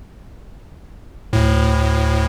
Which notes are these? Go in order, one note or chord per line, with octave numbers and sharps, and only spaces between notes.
D2 A2